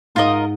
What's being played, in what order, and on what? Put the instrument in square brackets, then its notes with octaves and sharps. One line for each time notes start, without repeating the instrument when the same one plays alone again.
[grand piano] G#2 [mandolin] F4 A#4 D#5